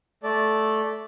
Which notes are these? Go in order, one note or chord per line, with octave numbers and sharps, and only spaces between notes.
A3 A4 D5